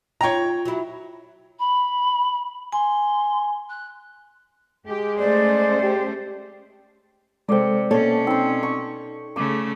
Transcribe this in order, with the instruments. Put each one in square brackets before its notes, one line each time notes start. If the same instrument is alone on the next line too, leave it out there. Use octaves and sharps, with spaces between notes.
[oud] D#4 F4 [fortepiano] C#5 G5 A#5
[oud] F#3 E4
[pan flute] B5
[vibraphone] G#5 [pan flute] C6
[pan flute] F#6
[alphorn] G#3 [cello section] G4
[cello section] A3 C#4 C5 [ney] D5
[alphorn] G4
[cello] C3 [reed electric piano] G#3 A4 C5 [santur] D5 G5
[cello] B2 C#4 [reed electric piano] A#3 C#5 [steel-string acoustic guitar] A4
[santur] C4 C5 [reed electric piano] D#4
[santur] C#6
[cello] C#3 A3 [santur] D6